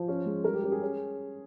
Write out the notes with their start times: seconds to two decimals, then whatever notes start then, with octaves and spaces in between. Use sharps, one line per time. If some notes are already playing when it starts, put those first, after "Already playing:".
Already playing: F3 C5
0.08 C#4
0.26 G#3
0.44 G3 A#4
0.53 G4
0.64 C#4 G4
0.72 G#4
0.82 C#4